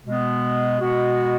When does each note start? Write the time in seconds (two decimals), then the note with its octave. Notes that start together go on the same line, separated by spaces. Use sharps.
0.04 B2 G#3 B3
0.80 B2 G#3 B3 F#4